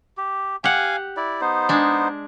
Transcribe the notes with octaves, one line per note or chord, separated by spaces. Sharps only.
G4
G4 F5 F#5 G#5
E4 D5
B3 D#4 C5
G#3 D4